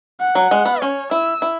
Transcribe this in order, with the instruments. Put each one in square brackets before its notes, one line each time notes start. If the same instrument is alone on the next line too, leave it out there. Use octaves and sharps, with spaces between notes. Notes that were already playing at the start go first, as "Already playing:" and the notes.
[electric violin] F#5
[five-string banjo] F#3
G#3
B3
[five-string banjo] C#4 [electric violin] C#5
[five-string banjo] E4 [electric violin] E6
[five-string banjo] E4